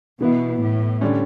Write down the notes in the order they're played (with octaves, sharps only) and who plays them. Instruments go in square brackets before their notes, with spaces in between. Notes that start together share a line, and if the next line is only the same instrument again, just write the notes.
[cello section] B2 [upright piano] E3 B3 E4
[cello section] A2
[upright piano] D3 G3 C#4